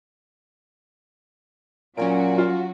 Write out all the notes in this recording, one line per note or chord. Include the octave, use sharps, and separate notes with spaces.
A#2 F#3 C#4 F#4 G#5 D7
F4